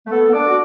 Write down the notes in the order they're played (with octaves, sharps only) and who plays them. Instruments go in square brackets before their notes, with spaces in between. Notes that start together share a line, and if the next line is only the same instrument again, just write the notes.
[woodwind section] A3
[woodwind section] B3 [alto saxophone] A4
[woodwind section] B3
[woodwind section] D4 [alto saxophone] D5
[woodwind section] F#4